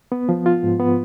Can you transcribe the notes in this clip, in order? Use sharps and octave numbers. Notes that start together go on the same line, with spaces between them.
B3
F3
F4
G#2
B3